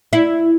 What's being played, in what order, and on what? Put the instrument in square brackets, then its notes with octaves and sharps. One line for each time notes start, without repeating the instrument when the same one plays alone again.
[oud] E4